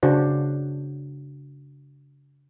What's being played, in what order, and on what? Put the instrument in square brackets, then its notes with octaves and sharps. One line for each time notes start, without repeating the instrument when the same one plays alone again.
[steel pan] C#3 D4 F#4 C5